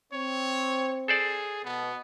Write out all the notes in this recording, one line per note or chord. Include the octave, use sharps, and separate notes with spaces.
C4 C#5
G#4 A4 C5 D5
B2 B3